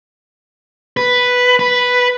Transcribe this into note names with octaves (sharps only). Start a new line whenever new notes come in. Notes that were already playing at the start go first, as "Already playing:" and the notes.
B4
B4